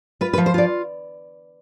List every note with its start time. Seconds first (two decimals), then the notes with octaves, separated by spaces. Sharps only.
0.21 F4 B4
0.33 B4
0.38 F3
0.46 C5
0.54 F4 D5